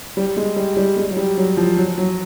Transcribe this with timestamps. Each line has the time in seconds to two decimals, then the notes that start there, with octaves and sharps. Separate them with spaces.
0.17 G3
0.37 G#3
0.56 G3
0.77 G3
0.97 G#3
1.11 F#3
1.17 G3
1.37 F#3
1.57 F3
1.77 F#3
1.98 F#3